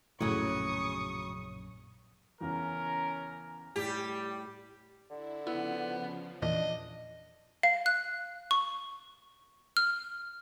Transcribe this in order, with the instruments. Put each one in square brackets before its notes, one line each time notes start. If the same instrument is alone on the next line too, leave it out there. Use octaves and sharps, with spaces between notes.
[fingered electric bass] A#1 F#2 [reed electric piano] A2 [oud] C#3 F#3 [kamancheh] C#6 D#6
[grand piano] E2 C#3 [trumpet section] C#4 A#4
[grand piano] A2 [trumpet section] G3 [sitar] G4
[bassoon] D3 [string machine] E4
[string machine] C#3 F3 [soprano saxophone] B3 [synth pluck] E4
[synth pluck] E2 A#2 E3 [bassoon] D4 [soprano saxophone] D#5
[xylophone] F5
F#6
C#6
F6